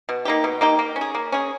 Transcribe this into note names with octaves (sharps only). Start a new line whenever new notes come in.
B2
A#3 D#4 G4
B2
A#3 D#4 G4
A#3
C#4
G#4
A#3
C#4 G#4